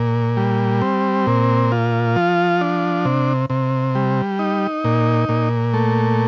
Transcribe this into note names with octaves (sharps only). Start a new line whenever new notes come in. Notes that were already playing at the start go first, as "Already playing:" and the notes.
Already playing: A#2
G3
C4
A#2
F4
F3
D4
C3
C3
G3
D#4
A#2
A#2
A3